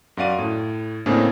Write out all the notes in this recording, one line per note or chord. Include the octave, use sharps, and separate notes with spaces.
F#2 F#4 D5 F5 D#7
A2
A2 C#3 A#3 C4 D4 G#4